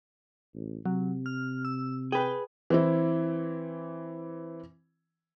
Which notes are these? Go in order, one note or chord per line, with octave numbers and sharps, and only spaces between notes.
A1
C3 F#3
F6
E6
G#4 B4 G5
E3 C4 E4